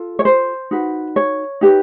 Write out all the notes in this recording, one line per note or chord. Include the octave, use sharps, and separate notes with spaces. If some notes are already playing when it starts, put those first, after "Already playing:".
Already playing: F4 A4
C#5
C5
D#4 F#4 B4
C#5
D#4 G4 B4